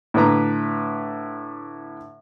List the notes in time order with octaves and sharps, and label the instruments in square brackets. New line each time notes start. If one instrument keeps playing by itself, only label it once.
[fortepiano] A2 D3 B4 A#5